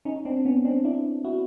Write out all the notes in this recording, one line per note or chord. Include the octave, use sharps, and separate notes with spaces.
C#4 D#4
C4 D4
B3 C#4
C4 D4
D4 E4
E4 F#4